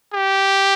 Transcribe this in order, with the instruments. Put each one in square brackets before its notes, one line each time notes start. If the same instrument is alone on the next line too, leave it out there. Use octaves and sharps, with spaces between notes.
[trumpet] G4